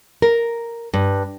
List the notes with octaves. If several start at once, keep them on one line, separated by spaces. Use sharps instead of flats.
A#4
G2